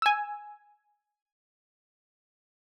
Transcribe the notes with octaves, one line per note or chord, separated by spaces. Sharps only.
G#5 E6